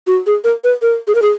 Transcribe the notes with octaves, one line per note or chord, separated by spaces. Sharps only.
F#4
G#4
A#4
B4
A#4
G#4
A#4
G#4